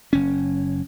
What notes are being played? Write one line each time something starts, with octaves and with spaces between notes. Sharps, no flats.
F#1 C#4